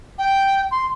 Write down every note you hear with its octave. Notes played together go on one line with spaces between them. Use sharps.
G5
C6